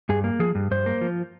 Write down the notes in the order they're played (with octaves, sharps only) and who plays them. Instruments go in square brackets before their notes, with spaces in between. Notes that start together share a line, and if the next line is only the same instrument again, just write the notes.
[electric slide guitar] G2 G#4
A#3
F3 G#4
G2
G2 C5
A#3
F3